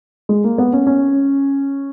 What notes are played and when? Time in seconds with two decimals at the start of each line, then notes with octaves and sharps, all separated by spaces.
0.29 G#3
0.44 A#3
0.58 B3
0.73 C#4
0.87 C#4